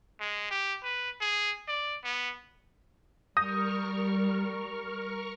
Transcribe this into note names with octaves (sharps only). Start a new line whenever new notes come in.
G#3
G4
B4
G#4
D5
B3
G3 A#4 C#6 D#6 F6 G6 A#6